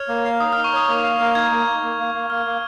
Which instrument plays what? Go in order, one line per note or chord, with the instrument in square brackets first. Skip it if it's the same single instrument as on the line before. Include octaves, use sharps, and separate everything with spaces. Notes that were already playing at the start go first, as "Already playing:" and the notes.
Already playing: [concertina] C#5 [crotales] F6
[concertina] A#3
F5
[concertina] D#4 [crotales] D#6
[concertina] D#4 [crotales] F6
[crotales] C#6
[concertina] C#5 [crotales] D#6
[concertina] A#3
F5
A#3
[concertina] D#4 [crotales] G#6
[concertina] A#3
A#3
A#3
A#3
A#3
[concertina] A#3 [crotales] F6
[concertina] A#3